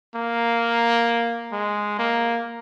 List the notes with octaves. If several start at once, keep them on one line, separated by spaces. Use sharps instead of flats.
A#3
G#3
A#3